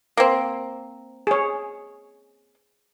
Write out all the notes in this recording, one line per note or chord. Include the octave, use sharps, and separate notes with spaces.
A#3 C4
G#4 C#5